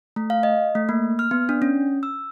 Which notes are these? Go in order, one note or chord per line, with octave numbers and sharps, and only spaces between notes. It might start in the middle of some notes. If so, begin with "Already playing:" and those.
A3
F5
D#5
A3
A#3
F6
B3
D4
C#4
E6